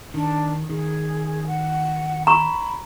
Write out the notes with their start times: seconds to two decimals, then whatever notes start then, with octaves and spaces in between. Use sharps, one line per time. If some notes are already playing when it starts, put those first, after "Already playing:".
0.14 D#3 D4
0.70 D#3 G#4
1.47 F#5
2.27 A#5 B5 C#6